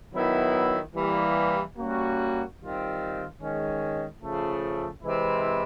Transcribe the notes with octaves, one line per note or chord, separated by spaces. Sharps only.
D#3 F#3 B3 E4
E3 G3 A#3
G3 A#3 C#4 F#4
D#3 G3 C4 F4
D#3 G#3 C#4
C#3 F3 A3
C3 E3 G#3 C4 E4